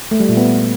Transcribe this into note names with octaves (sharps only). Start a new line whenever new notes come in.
A3
G3
A#2
B3